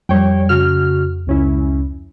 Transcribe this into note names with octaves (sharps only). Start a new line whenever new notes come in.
F2 G3 C#5 G5
C#3 F#4 F6
C#2 C#4 E4